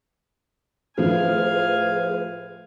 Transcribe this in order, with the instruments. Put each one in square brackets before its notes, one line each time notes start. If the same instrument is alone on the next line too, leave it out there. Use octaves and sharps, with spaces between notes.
[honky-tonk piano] A2 F3 [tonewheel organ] G#4 B4 C5 [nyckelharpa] F5 G#5